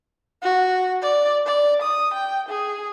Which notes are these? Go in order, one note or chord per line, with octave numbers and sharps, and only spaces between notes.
F#4
D5
D5
D#6
G5
G#4